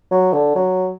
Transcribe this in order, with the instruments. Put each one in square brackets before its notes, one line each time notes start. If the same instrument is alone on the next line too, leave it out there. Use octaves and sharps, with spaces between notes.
[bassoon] F#3
D3
F#3